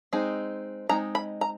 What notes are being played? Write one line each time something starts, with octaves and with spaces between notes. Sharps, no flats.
G#3 C4 D#4
G#3 C4 D#4 A#5
B5
A#5